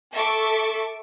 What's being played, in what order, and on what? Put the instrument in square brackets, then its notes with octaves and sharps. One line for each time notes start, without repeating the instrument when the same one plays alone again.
[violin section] A4 E5 C#6 D6